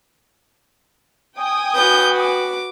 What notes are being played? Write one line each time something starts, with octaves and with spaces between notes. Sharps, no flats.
G5 G#5 D#6
F#4 B4 G6
D6